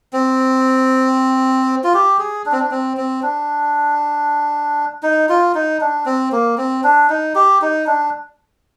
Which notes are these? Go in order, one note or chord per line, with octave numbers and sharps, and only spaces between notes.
C4
F4
G4
G#4
D4
C4
D4
C4
C4
D4
D#4
F4
D#4
D4
C4
A#3
C4
D4
D#4
G4
D#4
D4